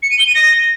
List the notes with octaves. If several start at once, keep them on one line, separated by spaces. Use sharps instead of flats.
C#7
D#7
G7
D#7
A#6